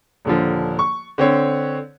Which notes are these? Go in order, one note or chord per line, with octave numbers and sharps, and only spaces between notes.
D#1 D3 F3
C#6
D3 C4 C#5